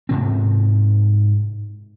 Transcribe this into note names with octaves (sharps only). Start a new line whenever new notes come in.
G#2 C3 C4